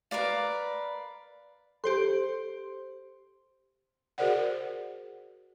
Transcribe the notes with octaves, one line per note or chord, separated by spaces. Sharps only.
A#4 B4 D5 F5
G4 A4 C5 C6
F#4 G#4 A#4 C5 D5 F#5